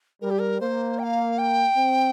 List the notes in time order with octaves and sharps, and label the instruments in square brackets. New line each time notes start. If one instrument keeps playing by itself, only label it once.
[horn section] G3 [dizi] A#4
[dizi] G4
A#4
[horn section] A#3 [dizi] C5
[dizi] G5
F5
G5
[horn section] C4